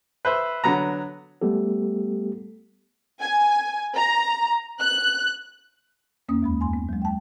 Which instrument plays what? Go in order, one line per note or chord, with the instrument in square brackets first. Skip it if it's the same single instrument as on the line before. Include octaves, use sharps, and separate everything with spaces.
[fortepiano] B4 C5 E5
D3 F#3 B3 A#5
[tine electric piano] G3 A3 B3 G4 A4
[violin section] G#5
A#5
F#6
[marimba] F2 A#3 C#4 D#6
D#2 G#3 B5
F#2 G#5 C6
B3
F#3 G#3
G5 A5